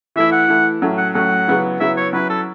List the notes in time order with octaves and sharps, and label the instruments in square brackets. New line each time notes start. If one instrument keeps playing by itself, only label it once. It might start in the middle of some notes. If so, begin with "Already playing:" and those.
[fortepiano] E3 A3 E4 [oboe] E5
[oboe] F#5
[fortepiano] E3 A3 E4
A2 F#3 A3 C#4
[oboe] F#5
[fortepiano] A2 F#3 A3 C#4 [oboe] F#5
[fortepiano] C#3 F#3 B3 E4
[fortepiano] C#3 F#3 B3 E4 [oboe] E5
[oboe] C#5
[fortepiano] F#3 C#4 E4 [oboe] B4
[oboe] A4